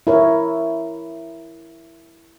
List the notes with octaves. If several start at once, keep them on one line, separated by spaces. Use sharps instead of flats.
E4 A#4 C#5